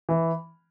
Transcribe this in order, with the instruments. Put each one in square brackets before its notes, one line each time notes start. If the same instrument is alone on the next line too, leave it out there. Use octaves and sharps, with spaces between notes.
[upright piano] E3